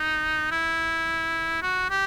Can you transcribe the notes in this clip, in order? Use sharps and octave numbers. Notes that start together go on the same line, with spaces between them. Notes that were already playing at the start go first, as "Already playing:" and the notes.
Already playing: D#4
E4
F#4
G4